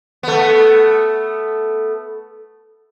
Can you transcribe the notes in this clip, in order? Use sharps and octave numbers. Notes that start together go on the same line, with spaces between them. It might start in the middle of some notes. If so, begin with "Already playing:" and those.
A3 B3